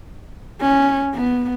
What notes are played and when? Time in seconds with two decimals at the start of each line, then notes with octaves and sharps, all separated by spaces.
0.61 C#4
1.15 B3